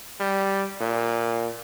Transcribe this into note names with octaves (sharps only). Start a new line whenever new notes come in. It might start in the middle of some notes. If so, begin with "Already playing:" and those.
G3
A#2